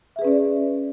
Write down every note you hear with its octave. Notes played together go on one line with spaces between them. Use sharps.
C#4 G#4 B4 D5 E5